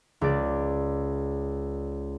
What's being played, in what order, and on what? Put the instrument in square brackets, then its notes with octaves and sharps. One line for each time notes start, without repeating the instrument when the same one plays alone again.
[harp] C#2 D5